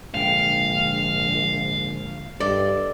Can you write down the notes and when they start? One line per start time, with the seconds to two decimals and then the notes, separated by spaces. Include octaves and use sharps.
0.14 A#1 G#2 D3 F5 G5
2.40 G2 A4 D5 D#5